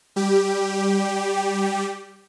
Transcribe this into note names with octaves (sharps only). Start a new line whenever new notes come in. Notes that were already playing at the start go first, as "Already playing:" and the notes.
G3 G4